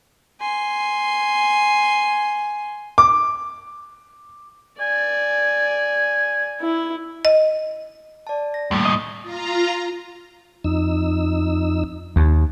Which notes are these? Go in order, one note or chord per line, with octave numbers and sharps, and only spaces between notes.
G#5 C6
D6
D5 G#5
E4
D#5
D5 A5
A#6
D#2 A2 G3 A3 A#3
D#5
F4 A#5
F2 D#4 E6
D#2